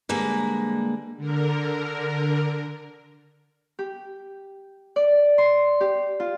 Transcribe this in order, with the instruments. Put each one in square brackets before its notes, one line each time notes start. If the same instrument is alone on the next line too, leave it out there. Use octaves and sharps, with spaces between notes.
[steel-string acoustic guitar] D3 G3 G#3 A#3 B4
[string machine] D3 A#4
[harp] G4
D5
C6
G4
F4